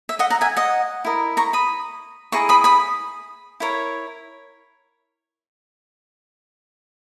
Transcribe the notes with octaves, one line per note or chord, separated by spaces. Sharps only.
E5
D#5 F#5
F#5 A#5
E5 G#5
D#5 F#5
E4 A#4 D#5
A#5 C#6
B5 D#6
E4 G#4 D#5 A#5 C#6
B5 D#6
B5 D#6
E4 A#4 C#5